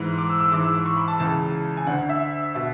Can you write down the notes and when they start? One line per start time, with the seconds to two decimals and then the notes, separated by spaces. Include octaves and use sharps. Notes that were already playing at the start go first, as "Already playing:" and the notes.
Already playing: G#2 E3
0.18 D6
0.30 E6
0.40 E6
0.52 G#2 E3 D6
0.63 E6
0.75 D6
0.86 C#6
0.97 B5
1.08 A5
1.19 C#2 C#3 E3 A5
1.77 G#5
1.87 D2 D3 F#5
2.09 E5
2.54 B2 E5